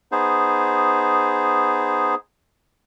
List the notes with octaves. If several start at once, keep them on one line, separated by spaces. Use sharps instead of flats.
B3 D#4 G#4 C5